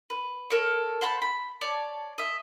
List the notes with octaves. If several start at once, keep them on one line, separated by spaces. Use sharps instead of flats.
B4
A4 A#4 C#5
C5 F#5 A5 B5
B5
C#5 D5 A5
D#5 E5